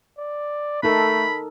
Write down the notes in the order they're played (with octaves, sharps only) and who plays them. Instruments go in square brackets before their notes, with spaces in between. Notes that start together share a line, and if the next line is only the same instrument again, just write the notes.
[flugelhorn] D5
[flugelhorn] A3 [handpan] D#4 A4 A#4 [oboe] B5